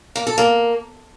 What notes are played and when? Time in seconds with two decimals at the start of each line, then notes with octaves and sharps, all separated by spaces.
0.16 A#3
0.27 A4
0.38 A#3